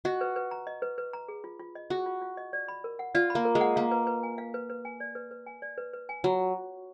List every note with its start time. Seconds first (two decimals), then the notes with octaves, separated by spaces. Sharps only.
0.05 F#4 D#5
0.21 B4
0.36 B4
0.51 A#5
0.67 D#5
0.82 B4
0.98 B4
1.13 A#5
1.28 G#4
1.44 F4
1.59 F4
1.75 D#5
1.90 F#4 G#4
2.06 F4
2.22 F4
2.37 D#5
2.53 D5
2.68 B5
2.84 A#4
2.99 F#5
3.15 F4 D5
3.30 B5
3.35 A#3
3.45 A#4
3.55 G#3
3.61 F#5
3.76 A#3 F5
3.91 B4
4.07 B4
4.23 G#5
4.38 F5
4.54 B4
4.70 B4
4.85 G#5
5.00 D5
5.15 B4
5.31 B4
5.46 G#5
5.62 D5
5.78 B4
5.94 B4
6.09 G#5
6.24 F#3 F#4